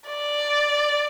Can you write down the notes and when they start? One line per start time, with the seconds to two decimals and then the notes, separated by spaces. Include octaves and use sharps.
0.08 D5